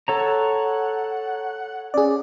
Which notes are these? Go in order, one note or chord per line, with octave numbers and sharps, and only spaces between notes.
A4 C#5 F#5 A#5
C#4 G#4 D5